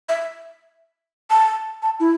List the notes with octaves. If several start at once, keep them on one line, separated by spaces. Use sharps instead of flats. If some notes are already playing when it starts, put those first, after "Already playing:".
E5
A5
A5
E4